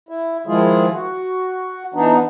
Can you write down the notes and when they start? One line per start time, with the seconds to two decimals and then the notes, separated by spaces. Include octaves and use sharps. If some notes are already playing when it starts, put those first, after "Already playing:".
0.09 E4
0.47 D#3 F3 G#3 E4 F4 G#4
0.92 F#4
1.94 E3 B3 D4 D#4